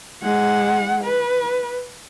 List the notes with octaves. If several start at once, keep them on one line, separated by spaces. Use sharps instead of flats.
G#3 F#5
B4